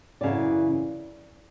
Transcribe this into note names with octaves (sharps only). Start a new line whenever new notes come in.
F#2 C#3 E3 D5